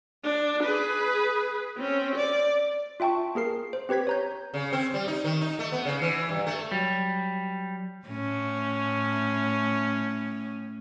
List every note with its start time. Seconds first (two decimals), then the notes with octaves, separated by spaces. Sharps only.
0.24 D4
0.64 G#4 B4
1.77 C4 C#4
2.16 D5
3.00 F4 E5 G5 A5 C#6
3.35 A#3 G#4 A#4 C7
3.73 C5
3.89 C4 G4 B4 G#6 B6
4.07 C#5 A#5 G6
4.54 C#3
4.73 C4
4.94 G3
5.08 D#4
5.24 D#3
5.41 D#4
5.59 A3
5.72 B3
5.85 C#3
6.01 E3
6.29 G2
6.47 A3
6.72 F#3 G3
8.07 A2 C#4